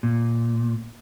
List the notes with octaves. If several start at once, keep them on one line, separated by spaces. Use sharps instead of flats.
A#2